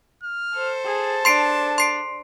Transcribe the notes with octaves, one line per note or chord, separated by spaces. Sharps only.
F6
A4 C5
G#4 A5
D4 C6 C7 D7
C6 C7 D7